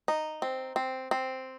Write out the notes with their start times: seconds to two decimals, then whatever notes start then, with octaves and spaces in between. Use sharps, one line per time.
0.08 D#4
0.42 C4
0.76 C4
1.11 C4